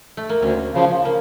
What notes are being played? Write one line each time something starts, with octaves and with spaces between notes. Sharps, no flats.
A3
A#3
D2 C#4
C#3 F3
A#3